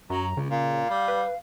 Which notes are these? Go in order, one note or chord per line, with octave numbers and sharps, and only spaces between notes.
F#2 F#3 A#5
C#2 C#3
A#2 F5
G3
B4